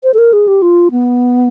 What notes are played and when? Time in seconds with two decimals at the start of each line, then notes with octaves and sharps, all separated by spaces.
0.03 C5
0.14 A4
0.18 A#4
0.33 G#4
0.47 G4
0.62 F4
0.91 B3